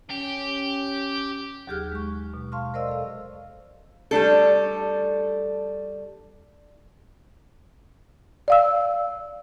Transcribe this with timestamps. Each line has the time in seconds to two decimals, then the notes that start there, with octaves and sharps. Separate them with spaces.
0.11 C#4 G4
1.67 D#2 F#3 G4 G#4 F6 F#6
1.92 G#3 C#6
2.34 B2
2.52 F5 A5 C6 C#6 F6
2.74 A#4 C5 D5 D#5 F5 E6
2.88 A4 F5
4.11 G3 A3 D4 A4
8.48 D5 F5 E6